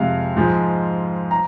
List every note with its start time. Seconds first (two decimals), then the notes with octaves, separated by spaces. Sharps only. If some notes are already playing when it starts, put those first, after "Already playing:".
Already playing: F2 C3 G#3 F5
0.36 G#2 F3 G#3
1.31 A#5